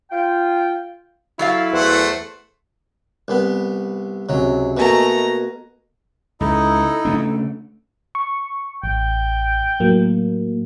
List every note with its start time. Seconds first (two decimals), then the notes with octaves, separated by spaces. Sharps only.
0.12 F4 G5
1.39 F#3 E4 A4 F5
1.72 E2 A3 C5 F#5
3.28 C2 B3
4.29 C#2 C3 F#3
4.77 B2 A3 A#3 D#5 G#5 A#5
6.41 C#2 D#4 E4 A4 D#5
7.05 C#3 A3 D4
8.15 C#6
8.84 A1 G5
9.80 A2 F#3 A#3